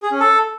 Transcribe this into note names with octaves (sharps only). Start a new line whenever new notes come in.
G#4
C#4
A4